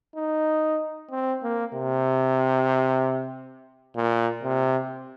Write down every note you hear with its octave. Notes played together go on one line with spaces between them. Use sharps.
D#4
C4
A#3
C3
A#2
C3